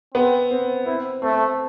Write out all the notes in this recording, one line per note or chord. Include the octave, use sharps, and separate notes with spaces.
B3 C4
C4
C4 E4
A3 C4